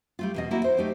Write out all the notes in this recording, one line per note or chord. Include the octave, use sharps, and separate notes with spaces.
G3 A3 F4
E2 B2 D#5
A#3 C4 E4 F#4
C5
A3 D#4 G4